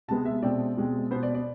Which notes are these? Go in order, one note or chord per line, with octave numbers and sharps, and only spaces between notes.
C3 G#3 B3 A5
E5
B2 G#3 C4 D5
B2 G#3 C4
B2 B3 C5
D5
D5